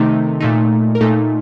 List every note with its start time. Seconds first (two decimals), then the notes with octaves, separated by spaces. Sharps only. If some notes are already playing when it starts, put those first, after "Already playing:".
Already playing: C3 D#3 A3 D#4
0.40 A#2 A3 D#4
0.95 A#4
1.01 A#2 A3 D#4 A4